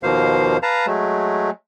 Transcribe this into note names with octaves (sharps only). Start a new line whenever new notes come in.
D#2 B2 F3 A#3 C5 F5
B4 F5 A5 A#5
F#3 G#3 A3